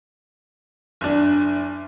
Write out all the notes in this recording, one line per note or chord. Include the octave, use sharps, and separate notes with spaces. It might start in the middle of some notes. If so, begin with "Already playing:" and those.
F#1 D4